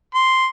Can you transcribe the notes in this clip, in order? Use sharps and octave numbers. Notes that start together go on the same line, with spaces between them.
C6